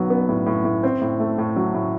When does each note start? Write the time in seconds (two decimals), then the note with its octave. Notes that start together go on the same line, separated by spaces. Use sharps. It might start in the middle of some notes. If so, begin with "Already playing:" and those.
Already playing: B1 F#3 B3
0.10 B3
0.29 A2
0.46 A2
0.65 A2
0.83 C4
1.01 A2
1.20 A3
1.38 A2
1.56 F#3
1.74 A2